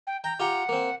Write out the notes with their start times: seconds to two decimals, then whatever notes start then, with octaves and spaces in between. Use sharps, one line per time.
0.07 G5
0.24 G5 A#5
0.40 F4 G4 F#5 A#5
0.69 A#3 C4